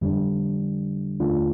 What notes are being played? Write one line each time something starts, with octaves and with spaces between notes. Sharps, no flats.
F2 D3 G3 D4
D#2 D3 A3 D4 F4